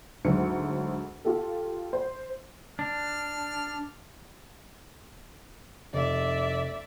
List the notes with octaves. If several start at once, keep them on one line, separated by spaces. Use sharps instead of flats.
D2 G#2 D#3 F#3 C#7
F4 G4 A4
C5
D4 F6
F1 D5 E5